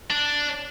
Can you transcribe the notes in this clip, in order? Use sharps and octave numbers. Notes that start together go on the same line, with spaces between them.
D4